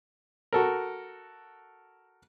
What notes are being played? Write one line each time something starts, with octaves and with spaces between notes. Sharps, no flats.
F#4 A4 A#4